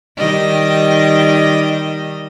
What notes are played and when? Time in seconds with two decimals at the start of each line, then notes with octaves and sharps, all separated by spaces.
0.18 D#3 G3 D#5